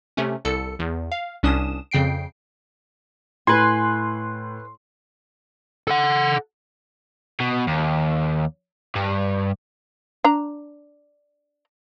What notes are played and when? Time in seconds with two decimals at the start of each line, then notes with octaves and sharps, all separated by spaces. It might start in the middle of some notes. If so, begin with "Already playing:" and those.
0.17 C3 A3 C#4
0.45 C2 A4 C#7
0.79 E2
1.12 F5
1.43 C2 C#4 D4 D#6 E7
1.91 F2 C#3 G5 C7 D7
3.47 A2 B4 G#5 C6
5.87 A4 F#5
7.40 B2
7.67 D#2
8.96 G2
10.24 D4 A#5